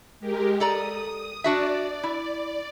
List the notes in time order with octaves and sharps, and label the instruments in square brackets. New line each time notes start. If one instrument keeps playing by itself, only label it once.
[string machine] G#3 G4 A#4
[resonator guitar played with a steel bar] A4 D5 A#5 [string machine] D#6
[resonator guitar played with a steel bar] D4 F#4 E5 [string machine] D5
[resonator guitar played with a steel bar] E4